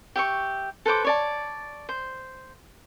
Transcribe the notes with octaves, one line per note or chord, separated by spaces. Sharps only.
G4 E5 C#6
A4 B4 C5 D6
C#5 D5 A5
C5